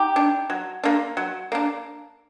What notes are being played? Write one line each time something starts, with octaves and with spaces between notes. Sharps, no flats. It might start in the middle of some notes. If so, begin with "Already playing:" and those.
Already playing: D#4 G4
D4
F#3
A#3 D4
F#3
A#3 D4